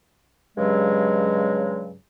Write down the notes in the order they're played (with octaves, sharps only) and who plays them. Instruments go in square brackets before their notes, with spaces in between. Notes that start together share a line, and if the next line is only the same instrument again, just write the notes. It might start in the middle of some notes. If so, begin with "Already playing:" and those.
[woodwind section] G2 C#3 F#3 G#3